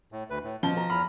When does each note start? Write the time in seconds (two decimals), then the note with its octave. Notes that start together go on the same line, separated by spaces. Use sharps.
0.12 A2
0.30 D2 B4
0.44 A2
0.63 B2 F3 G7
0.77 A#5
0.90 E2 B5 F6